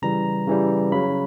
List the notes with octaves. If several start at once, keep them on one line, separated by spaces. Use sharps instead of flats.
C#3 E3 G3 A#5
C#3 E3 G3
C#3 F#3 B5